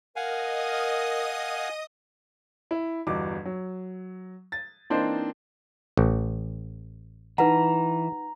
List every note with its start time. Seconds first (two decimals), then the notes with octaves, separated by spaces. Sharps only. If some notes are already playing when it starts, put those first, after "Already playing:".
0.16 A#4 D#5 F5 F#5 G#5 D#6
2.71 E4
3.07 G1 E2 F#4 D#5 D6
3.45 F#3
4.52 A6
4.90 E3 A#3 C4 D4 D#4 C5
5.97 A1
7.38 E3 D#4 B4 F#5 A#5